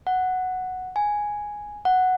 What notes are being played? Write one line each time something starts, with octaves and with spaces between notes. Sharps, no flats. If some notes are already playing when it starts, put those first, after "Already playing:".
F#5
G#5
F#5